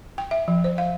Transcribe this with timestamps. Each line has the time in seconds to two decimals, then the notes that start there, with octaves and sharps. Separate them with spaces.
0.18 G5
0.31 E5
0.48 F3
0.64 C5
0.78 F5